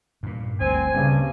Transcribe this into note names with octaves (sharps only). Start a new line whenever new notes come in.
G2 A#2
G1 D2 G2 C4 G#5
G2 C#3 G3 A#3 C4